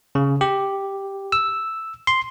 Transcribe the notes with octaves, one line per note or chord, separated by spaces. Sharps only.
C#3
G4
E6
C6